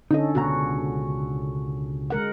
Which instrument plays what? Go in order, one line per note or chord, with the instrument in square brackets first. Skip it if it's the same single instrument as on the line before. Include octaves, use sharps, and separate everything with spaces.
[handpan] D3 C#4 A4 [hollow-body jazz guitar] D#4 D#5
[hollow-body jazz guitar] C#2 B2 A#5 [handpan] F#4
[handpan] G#3 A#4 F#5